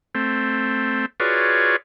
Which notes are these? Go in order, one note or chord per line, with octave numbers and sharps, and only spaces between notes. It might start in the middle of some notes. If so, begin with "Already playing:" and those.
A3 C4
F4 F#4 G#4 B4 C#5 D5